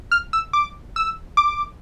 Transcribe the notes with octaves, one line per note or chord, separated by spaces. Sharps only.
F6
E6
D6
E6
D6